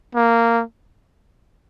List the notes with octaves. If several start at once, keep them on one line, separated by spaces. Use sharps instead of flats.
A#3